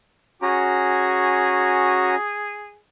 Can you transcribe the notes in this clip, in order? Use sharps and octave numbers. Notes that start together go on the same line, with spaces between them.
C#4 F#4 G#4 A#5